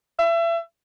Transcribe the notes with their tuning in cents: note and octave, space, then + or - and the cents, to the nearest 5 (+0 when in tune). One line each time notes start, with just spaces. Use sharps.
E5 +30